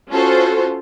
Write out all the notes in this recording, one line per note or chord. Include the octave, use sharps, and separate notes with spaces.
C#4 F4 F#4 A4 C5